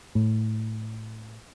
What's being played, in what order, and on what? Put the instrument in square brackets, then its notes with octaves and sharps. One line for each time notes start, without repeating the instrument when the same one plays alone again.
[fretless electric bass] A2